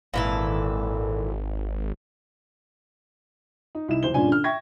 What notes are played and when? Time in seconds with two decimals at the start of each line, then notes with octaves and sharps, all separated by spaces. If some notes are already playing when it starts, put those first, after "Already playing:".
0.14 G#1 A#2 E3 A4
3.75 D#4
3.88 C2 D#4 E4 E7
4.03 F#1 E2 C5 G7
4.14 G2 A#2 C#4 D4 F4 G#5
4.28 D3 F6
4.44 E5 G5 C#6 G#6 A#6